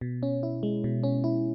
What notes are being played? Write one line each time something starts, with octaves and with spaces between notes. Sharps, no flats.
B2
C#4
E4
G#3
B2
C#4
E4